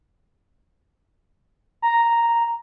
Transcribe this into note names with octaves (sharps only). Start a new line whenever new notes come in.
A#5